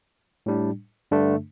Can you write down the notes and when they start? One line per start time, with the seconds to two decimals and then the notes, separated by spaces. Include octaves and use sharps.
0.46 A2 G3 D4
1.11 G2 D3 A3 D4